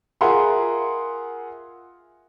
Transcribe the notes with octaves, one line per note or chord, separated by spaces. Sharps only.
F4 G#4 A#4 E5 F#5 C6